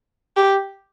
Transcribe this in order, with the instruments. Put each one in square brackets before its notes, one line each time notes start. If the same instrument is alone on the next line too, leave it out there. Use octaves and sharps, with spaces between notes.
[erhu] G4